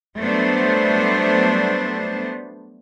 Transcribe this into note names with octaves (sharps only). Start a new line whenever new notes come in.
F#3 G3 A3 B3 D4 C5